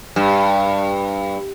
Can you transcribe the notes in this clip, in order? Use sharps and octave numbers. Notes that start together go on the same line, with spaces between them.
G2